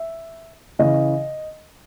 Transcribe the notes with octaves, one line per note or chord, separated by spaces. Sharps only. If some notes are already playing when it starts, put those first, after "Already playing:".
Already playing: E5
C#3 E3 D#5